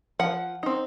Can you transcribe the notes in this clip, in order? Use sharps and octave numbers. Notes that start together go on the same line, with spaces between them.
F3 F#5
C4 D#4